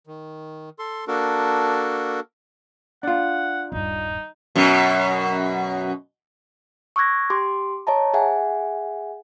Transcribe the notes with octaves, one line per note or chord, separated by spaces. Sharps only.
D#3
A4 C6
A#3 D4 F#4 A4 A#4
D4 F4 F#5
D#1 G2 D#4
F#2 B2
C#6 D6 E6 F#6 G#6 A#6
G4 C6 D6
C#5 D#5 A5 A#5
G#4 E5 F#5 G#5